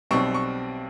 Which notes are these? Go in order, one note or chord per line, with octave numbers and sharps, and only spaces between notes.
B1 B2 G3 C4 C#6
C#6